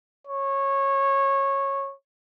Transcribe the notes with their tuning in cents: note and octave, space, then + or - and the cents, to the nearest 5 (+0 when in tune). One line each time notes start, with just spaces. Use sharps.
C#5 -15